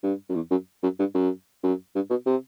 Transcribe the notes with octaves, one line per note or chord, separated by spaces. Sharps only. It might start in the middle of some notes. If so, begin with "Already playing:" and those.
G2
F#2
E2
F#2
F#2
G2
F#2
F#2
G2
B2
C3